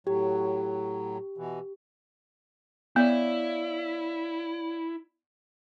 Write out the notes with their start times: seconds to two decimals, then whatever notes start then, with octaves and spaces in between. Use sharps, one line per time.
0.07 A2 F#3 G4
1.37 B2 E3
2.96 B3 E4 C#5 D5 F5